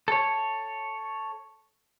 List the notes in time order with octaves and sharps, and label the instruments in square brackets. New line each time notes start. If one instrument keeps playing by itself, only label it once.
[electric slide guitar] A4 C#5